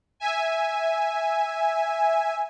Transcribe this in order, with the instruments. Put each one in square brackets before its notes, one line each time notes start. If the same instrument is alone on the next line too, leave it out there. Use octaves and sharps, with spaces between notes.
[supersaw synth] E5 G#5